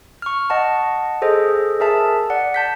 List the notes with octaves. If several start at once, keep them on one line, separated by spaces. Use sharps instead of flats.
C#6 F6
D#5 F#5 A5
G#4 A4 C5 D#5
G#4 A#4 E5 A5
D5 F#5
A5 G6 B6